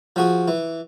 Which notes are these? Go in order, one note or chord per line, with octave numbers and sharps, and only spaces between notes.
F3 F#4 G#4
E3